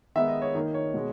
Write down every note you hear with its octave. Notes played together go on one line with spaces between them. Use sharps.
D#3 G#3 B3 D#4 E5
D#5
C#5
D#3 A#3 D#4
C#5
B2 G#3